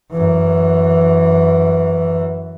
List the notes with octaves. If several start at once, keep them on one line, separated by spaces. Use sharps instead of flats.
F#2 E3